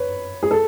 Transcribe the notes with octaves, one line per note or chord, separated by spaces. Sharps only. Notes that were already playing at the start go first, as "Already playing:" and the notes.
Already playing: B4 C#5
G#4
A4